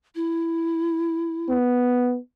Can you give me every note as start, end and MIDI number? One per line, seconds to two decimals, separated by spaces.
0.15 1.55 64
1.50 2.18 59